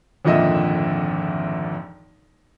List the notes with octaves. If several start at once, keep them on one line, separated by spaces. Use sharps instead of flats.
G#1 F2 A#2 D3 D#5 E5